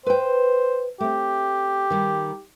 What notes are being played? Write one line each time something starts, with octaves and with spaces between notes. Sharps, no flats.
B4 C5 G5
A3 C4 G4
D#3 G3